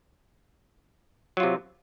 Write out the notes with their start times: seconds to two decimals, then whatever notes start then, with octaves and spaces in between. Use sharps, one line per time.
1.37 F#3
1.40 F4
1.43 C3